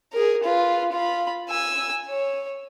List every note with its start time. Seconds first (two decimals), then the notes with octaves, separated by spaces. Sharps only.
0.12 G#4 A#4
0.43 F4 B4
0.92 F4 B5
1.49 G#5 E6
2.10 C#5